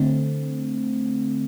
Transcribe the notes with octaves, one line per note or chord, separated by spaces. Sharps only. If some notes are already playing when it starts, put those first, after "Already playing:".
Already playing: D3 A3 C4